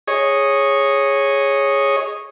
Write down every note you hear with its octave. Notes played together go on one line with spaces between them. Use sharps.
G#4 C#5 D#5